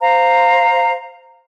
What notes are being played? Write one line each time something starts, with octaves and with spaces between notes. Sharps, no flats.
C5 F5 A#5